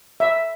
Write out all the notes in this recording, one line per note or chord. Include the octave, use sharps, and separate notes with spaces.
E5